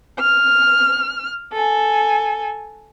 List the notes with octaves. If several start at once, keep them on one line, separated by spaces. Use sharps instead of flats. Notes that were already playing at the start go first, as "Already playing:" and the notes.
F6
A4 G#5